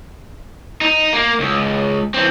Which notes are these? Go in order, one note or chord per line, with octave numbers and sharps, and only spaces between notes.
D#4
A#3
C#2
E3 C4